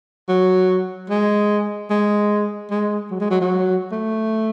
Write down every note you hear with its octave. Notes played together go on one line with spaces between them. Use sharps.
F#3
G#3
G#3
G#3
F#3
G#3
F#3
F#3
A3